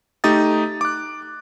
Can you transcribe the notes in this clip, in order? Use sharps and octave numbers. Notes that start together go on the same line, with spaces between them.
A3 D#4 G4 D#6 A6
D6 F#6